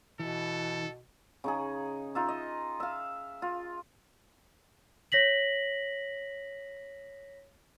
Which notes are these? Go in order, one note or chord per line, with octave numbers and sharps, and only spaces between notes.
B2 E3 A4
C#3 D#4 G#4
D#4 F4 E5
D#5
E5 F5
F4
C#5 A#6 B6 F#7